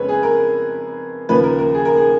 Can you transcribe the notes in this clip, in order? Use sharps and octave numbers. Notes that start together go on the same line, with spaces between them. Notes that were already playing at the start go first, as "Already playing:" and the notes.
Already playing: F2 C#3 G#3 B3 B4 C#5
G#4
A#4
D#2 C#3 F3 A#3 B4
A#4
A#4
G#4
A#4
G#4